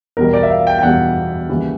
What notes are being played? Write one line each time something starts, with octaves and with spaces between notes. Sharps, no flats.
E2 B2 G3 A#4
D5
E5
F5
G5
G5
E2 B2 G3 F#5
D#2 C#3 E3 G3